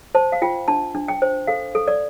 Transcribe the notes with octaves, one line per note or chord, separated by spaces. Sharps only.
C5 A5
F5
F4 G5
D4 A5
D4
G5
C5
A4 F5
A4
D5